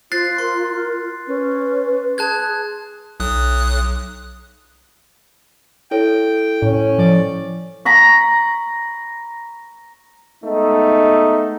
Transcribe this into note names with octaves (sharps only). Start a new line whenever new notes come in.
F4 C5 F#6 A6 C7
A#4 C6
C#4 B4
G#4 A5 F#6 G#6
B1 D#6 F#6
E4 A4 C#5 G5
A2 C#4
F3 D5
A#5 B5 C#6
G#3 A3 B3 D#4